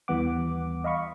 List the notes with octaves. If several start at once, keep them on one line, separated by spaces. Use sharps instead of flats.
D#2 E3 G3 B3 F#5 D6
D#5 F5 B5 C#6